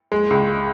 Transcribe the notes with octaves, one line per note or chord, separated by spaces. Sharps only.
G#3
C#2